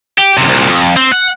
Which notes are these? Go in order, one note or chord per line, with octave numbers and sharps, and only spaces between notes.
G4
F#2 C3
C2 A#2
F2
C4
F#5